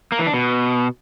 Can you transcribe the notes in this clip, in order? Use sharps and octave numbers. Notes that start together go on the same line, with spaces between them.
A#3
E3
D4
B2